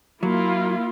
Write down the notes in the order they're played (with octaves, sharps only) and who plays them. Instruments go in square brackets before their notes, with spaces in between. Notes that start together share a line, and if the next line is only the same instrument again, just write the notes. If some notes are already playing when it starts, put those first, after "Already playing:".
[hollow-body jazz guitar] F#3 [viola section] A#3 E4 F4